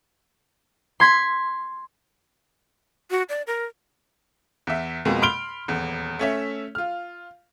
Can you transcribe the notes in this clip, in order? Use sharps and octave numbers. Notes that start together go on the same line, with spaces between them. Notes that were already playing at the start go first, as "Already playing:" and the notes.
C6 G#6 B6
F#4
D5
A#4
E2 E5
F2 B2 G#3 A#3
B5 C6 F6 D7 F7 G7
D#1 E2
A3 C#4 E5
F4 F6